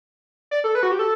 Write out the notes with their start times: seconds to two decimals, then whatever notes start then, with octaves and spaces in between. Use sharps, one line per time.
0.51 D5
0.64 A4
0.75 B4
0.83 F#4
0.91 G4
0.99 A4